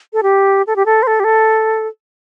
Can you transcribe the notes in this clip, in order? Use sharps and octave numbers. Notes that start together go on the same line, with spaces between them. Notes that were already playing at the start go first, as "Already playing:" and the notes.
A4
G4
A4
G4
A4
C5
A4
G4
A4